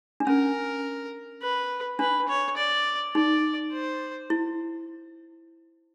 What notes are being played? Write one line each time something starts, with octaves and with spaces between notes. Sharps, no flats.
D4
C#4 A#4
B4
D4 B4
C#5
D5
D#4 D5
C5
E4